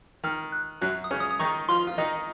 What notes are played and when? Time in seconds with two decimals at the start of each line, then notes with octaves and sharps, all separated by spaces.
0.24 D#3 F6
0.52 F#6
0.81 F#2 F#3 F#6
1.04 D#6
1.11 C#3 C#4 F6
1.20 D#6
1.31 D#6
1.39 D#3 D#4 C#6
1.68 F3 F4 C6
1.87 F4
1.98 D#3 D#4 D#5